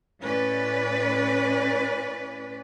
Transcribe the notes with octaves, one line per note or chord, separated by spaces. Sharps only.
A2 C#4 B4 D5